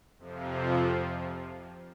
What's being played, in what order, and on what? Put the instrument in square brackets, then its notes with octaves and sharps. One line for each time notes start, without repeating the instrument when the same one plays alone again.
[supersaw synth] F2 C3 F3